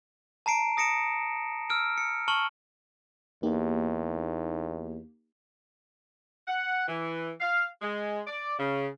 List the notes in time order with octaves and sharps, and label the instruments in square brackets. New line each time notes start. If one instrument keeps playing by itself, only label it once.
[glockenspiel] A5 A#5 C7 D7
D#6 A#6 C#7 D7 E7
E6 F6 D7
C#7
A5 C#6 F6 E7 F#7
[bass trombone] E2 [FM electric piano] A#3 D#4 G4
[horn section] F#5
E3
F5
G#3
D5
C#3